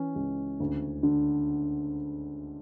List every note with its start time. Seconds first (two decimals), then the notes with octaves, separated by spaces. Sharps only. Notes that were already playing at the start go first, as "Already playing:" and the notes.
Already playing: E3 C#4
0.16 C#2
0.60 D2
1.03 D3